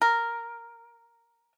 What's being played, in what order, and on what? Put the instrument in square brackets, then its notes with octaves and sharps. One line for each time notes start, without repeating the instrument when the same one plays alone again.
[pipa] A#4